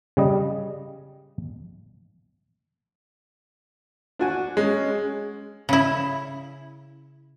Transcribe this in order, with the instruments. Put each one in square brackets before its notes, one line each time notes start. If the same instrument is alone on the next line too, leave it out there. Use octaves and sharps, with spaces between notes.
[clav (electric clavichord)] C#3 G3 D#5
[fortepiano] D4 F#4 G#5
[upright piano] G#3 [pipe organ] C#4
[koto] C#3 E4